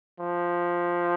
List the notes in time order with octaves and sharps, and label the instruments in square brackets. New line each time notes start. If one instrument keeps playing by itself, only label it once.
[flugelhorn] F3